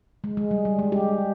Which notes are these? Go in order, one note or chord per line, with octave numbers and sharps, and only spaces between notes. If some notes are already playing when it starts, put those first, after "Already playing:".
G#3
G#3
G3
G3
G#3
G4